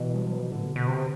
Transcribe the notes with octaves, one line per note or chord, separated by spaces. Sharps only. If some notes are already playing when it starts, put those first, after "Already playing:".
Already playing: B2 E3
G3
F#3
E3
A2 D3
B2
B2
C3